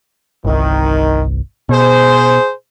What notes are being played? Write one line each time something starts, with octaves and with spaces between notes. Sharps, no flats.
G1 C2 D#3
B2 G#4 C5